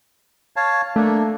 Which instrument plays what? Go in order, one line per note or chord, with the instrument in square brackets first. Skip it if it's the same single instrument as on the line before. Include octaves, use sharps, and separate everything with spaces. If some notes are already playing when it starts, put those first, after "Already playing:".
[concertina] C#5 F5 A5
[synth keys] A3 [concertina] A#3 D4